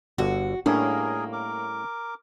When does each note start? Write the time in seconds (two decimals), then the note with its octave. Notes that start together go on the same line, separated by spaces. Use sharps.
0.18 G1 D3 F#4
0.66 A2 G3 A#3 C#4 D4 G#4 A#4 G#5
1.33 A#4 D6